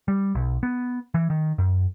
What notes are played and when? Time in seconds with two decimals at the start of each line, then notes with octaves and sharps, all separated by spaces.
0.08 G3
0.35 B1
0.63 B3
1.14 E3
1.30 D#3
1.58 F#2